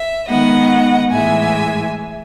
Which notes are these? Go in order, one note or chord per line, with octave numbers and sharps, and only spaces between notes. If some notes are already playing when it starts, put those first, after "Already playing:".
Already playing: E5
D#3 G#3 B3 D#5 F#5
A2 E3 G#3 E5 G#5